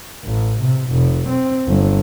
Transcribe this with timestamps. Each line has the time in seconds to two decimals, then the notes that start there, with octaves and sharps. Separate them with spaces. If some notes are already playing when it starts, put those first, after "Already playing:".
0.24 A1
0.60 C3
0.92 F1
1.29 C4
1.68 G1